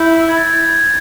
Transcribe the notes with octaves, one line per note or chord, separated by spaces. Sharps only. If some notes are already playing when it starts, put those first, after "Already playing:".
Already playing: E4 G6
G#6
A6
G#6
A6
G#6
A6
G#6
A6